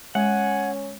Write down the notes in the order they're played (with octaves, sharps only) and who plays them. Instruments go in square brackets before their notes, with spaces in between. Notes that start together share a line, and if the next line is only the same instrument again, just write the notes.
[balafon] G#3 [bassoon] C#4 [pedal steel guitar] F#5 [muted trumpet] G#5